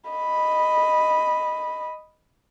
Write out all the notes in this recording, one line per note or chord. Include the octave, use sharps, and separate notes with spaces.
D#5 B5